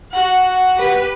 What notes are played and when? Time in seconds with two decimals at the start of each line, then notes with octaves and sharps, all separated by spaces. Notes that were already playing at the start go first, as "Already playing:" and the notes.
0.11 F#4 F#5
0.77 G4 B4